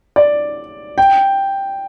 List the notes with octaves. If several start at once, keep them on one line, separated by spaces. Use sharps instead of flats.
D5
G5